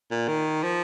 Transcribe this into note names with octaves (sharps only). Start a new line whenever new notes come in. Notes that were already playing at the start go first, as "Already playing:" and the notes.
A#2
D#3
F3